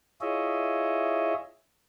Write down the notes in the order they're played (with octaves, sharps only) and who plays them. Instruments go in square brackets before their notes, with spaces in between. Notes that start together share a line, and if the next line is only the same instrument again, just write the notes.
[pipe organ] E4 F4 G#4 C#5 D#5 E5